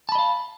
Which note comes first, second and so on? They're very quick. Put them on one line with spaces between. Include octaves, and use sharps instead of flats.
A5 B5 D#5 F5